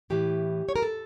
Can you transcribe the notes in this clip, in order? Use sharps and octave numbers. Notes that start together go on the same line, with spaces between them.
A2 E3 G4
C#5
A#4
A4